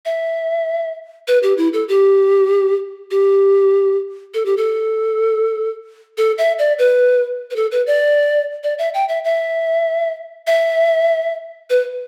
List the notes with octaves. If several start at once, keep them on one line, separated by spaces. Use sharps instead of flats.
E5
B4
G4
E4
A4
G4
G4
A4
G4
A4
A4
E5
D5
B4
B4
A4
B4
D5
D5
E5
G5
E5
E5
E5
B4